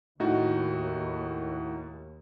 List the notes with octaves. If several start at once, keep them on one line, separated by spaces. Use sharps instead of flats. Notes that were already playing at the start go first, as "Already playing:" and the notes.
D#2 A2 D#4 F#4